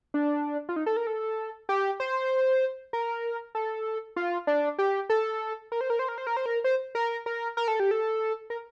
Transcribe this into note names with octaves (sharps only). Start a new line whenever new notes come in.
D4
F4
D#4
A4
A#4
A4
G4
C5
A#4
A4
F4
D4
G4
A4
A#4
C5
A#4
C5
A#4
C5
A#4
C5
A#4
C5
A#4
A#4
A#4
A4
G4
A4
A#4